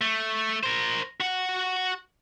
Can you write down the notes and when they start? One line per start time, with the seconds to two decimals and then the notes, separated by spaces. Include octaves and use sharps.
0.01 A3
0.63 A#4 C5
1.20 F#4 F#5